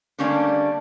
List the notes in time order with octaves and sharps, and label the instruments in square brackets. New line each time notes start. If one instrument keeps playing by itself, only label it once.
[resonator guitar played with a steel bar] D3 G3 A3 A#3 C#4 D4